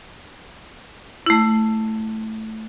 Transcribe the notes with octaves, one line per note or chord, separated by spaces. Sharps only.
A3 E4